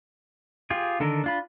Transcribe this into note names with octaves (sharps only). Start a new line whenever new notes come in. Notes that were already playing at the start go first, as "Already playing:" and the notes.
F4 G4 G#4
D3 D#3 A4 A#4
D4 F4 B5